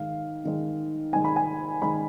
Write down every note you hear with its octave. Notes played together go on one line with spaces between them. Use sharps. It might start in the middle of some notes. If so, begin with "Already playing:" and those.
Already playing: G#2 D#3 G#3 F5
G#2 D#3 G#3
G#2 D#3 G#3 G#5
B5
G#5
G#2 D#3 G#3 B5